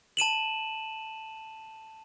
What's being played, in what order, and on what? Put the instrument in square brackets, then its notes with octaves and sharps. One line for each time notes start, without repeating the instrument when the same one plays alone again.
[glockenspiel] A5 D#7 E7 F#7